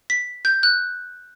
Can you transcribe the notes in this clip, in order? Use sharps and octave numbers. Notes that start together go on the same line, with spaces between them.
B6
G6
F#6